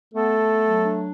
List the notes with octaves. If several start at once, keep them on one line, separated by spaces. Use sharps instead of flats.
A3 B3 A4
B3
F#3
D4